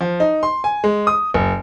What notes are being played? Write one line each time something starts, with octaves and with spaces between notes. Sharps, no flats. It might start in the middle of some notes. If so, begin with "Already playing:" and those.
F3
D#4
C6
G#5
G#3
D#6
F#1